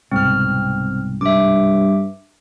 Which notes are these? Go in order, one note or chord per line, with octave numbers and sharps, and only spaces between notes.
C2 G#2 B2 C4 F6
G2 E5 D6